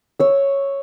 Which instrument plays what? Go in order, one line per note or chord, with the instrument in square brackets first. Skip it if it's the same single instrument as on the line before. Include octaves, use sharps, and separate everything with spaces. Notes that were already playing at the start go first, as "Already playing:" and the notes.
[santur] C#5 E6